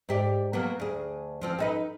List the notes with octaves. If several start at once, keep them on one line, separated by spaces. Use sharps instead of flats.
G#2 G4 D5
F#3 A#3 B3
D2 G#4
F3 C4 F4
C4 D#4 B4